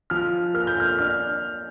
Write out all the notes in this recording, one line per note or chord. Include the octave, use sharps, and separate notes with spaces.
F3 F6
A#3 F6
G6
F6
D4 F6